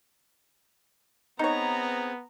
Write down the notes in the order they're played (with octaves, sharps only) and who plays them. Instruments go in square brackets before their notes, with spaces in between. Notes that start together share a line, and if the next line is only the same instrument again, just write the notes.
[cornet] B3 [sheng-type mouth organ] C4 G#4 B4 [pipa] D#4 C#5 [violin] A#5